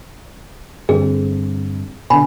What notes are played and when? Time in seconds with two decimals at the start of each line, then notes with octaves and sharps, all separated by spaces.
0.89 G2 D3 C4 G#4
2.10 B2 D3 G#5 B5